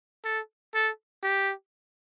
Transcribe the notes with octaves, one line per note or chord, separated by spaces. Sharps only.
A4
A4
G4